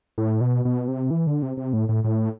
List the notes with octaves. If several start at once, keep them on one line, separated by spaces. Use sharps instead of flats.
A2
B2
B2
C3
E3
D3
C3
C3
A2
A2
A2